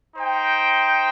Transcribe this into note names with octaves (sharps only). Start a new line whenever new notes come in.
D#4 C5 G5